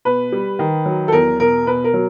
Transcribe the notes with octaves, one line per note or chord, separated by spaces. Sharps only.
B2 B4
G3
D#3
F#3
A4
E2 A#4
B2 A#4
B2 B4
A#4
F#3